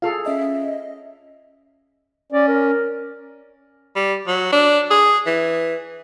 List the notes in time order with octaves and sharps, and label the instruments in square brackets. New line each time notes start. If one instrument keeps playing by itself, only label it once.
[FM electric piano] F4 [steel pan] G#4 A4 F5
[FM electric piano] C#4 D#5 [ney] E5
[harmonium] C#4 [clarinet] D5
[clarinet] A#4
[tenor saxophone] G3
F#3
D4
G#4
E3